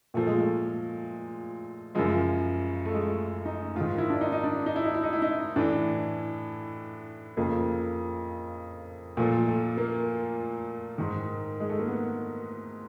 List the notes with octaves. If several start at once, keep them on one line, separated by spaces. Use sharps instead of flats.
A#2 F3 A3
G#3
A3
F#2 C#3 F3 G#3
A3
G#3
A3
D#4
G#2 D#3 F4
E4
D4
D#4
D#4
D4
D#4
E4
D#4
E4
D#4
E4
D#4
A2 E3 D4
F2 C#3 F3 A#3
A#2 F3 A3
A3
A#3
G#2 D#3
G#3
A3
A#3
B3